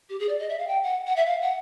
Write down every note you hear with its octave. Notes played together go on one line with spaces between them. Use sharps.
G4
G#4
D5
D#5
E5
F5
G5
F#5
F#5
E5
F5
F#5